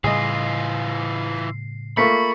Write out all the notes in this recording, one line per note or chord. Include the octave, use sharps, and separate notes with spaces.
A2 C#3 E3 G3 F4 G#4 D#5 C7
A3 A#3 F4 B5 C#6 B6 C#7